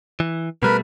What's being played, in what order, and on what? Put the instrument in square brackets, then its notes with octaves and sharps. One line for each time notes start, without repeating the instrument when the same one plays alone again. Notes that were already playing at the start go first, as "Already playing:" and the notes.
[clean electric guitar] E3
[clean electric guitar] B2 G3 A3 [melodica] A#4 B4